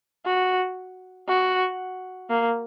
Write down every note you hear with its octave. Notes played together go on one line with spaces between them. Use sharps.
F#4
F#4
A#3